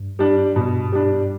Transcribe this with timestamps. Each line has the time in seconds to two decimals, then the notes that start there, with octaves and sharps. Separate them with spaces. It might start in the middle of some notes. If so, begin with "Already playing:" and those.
Already playing: G2
0.19 G3 D4
0.56 G2 B2
0.92 G3 D4